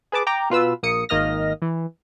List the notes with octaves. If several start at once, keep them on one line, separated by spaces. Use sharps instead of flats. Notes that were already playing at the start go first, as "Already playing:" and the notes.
G#4 B4 A5 D6
G5 A#5 D6
B2 F4 B4 E6
A#1 A#3 D#6 C#7
G#1 D#3 A#3 D#5 F6 A#6
E3